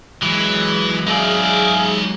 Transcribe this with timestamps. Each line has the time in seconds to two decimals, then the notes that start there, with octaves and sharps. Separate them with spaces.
0.23 E3 F#3 G#3
1.07 D#4 G#4 D5 E5 F5